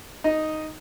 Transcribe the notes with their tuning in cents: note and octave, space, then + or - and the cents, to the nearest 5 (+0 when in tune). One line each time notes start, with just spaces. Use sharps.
D#4 +0 D#5 +0